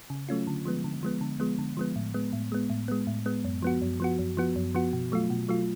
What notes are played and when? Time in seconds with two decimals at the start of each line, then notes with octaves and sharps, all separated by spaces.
0.10 C#3
0.29 F#3 A3 C#4 F4
0.47 D3
0.65 F3 G#3 B3
0.84 D3
1.03 F3 G#3 B3
1.21 D3
1.40 F3 G#3 B3
1.59 D3
1.77 F3 G#3 B3
1.96 A2
2.14 G#3 B3
2.33 A2
2.52 G#3 B3
2.70 A2
2.88 G#3 B3
3.07 A2
3.26 G#3 B3
3.45 F#2
3.62 F3 B3 F#4
3.82 F#2
4.00 F3 B3 F#4
4.19 F#2
4.37 F3 B3 F#4
4.56 F#2
4.75 F3 B3 F#4
4.93 B2
5.12 F#3 A3 F4
5.30 B2
5.49 F#3 A3 F4